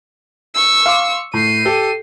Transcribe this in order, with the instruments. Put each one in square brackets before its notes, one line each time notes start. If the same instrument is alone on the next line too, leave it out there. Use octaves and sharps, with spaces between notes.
[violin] C#6 E6
[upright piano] F5 C6 D6
[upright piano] A2 [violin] C7 D#7
[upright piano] G4 A4 G5